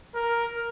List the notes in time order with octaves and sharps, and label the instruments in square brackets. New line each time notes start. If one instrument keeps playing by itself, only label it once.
[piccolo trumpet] A#4